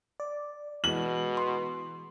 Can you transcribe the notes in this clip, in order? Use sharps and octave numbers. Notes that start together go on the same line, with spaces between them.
D5
B2 E3 G#3 F#7
C6